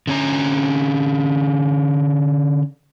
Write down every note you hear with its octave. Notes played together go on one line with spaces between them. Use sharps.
D3 C#4 A#5